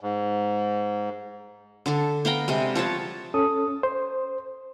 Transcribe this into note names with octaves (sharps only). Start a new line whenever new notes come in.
G#2
D3 D4 A4
B3 F5 G5 A#5
C3 G3 G#3
F3 C#5 F#5 A5
C#4 A4 D#6
C5